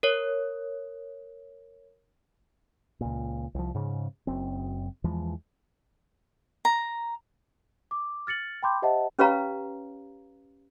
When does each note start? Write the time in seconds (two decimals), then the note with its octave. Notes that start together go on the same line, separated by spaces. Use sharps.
0.03 A#4 C#5
3.01 C#2 A#2
3.55 C2 F3
3.75 G#2 C#3
4.27 F#1 F#2 C4
5.04 E2 E3 F3 G#3
6.65 A#5
7.91 D6
8.27 F6 A6 C#7 F#7
8.63 G5 A5 B5 C6 D6 G6
8.82 G4 C5 D#5 E5 F#5 A5
9.19 C#4 G4 B4 C#5 F5 A#5